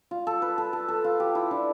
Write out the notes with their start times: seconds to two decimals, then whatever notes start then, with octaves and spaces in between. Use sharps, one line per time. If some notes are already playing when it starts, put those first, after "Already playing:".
0.11 F4
0.27 A4
0.42 B4
0.58 A4
0.73 A4
0.88 A4
1.04 F4
1.20 G4
1.35 E4
1.51 D4